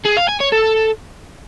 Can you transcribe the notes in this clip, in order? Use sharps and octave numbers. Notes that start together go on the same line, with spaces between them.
G#4
F5
G#5
C#5
A4